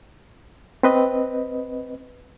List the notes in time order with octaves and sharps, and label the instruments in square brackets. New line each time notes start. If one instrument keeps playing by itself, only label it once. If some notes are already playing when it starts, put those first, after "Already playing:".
[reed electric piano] C4 B4 D#5